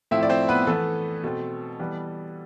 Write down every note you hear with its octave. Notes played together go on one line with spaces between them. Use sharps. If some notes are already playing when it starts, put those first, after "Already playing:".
A2 F3 A3 C4 E4 E5
D5
C4 C5
B3 B4
E3 A3 B3 A4
B2 A3 C4
E3 G3 B3